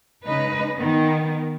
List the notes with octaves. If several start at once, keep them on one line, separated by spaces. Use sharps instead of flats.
C#3 G#3 D#4 B4 D#5
D#3 B3